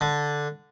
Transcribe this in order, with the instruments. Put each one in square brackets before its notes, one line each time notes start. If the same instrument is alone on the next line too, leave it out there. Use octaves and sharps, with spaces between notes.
[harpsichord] D3